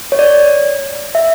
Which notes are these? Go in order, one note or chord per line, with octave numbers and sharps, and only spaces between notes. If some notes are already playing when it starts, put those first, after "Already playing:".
C#5
D5
E5